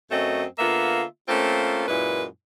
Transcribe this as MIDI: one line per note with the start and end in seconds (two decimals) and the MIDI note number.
0.11 0.44 42
0.11 0.44 54
0.11 0.44 57
0.11 0.44 60
0.11 0.44 75
0.59 1.03 50
0.59 1.03 58
0.59 1.03 59
0.59 1.03 65
0.59 1.03 76
1.28 1.84 57
1.28 1.84 58
1.28 1.84 60
1.28 1.84 61
1.28 1.84 65
1.88 2.25 42
1.88 2.25 46
1.88 2.25 56
1.88 2.25 64
1.88 2.25 71